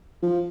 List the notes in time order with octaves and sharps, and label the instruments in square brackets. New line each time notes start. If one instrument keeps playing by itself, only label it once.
[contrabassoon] F3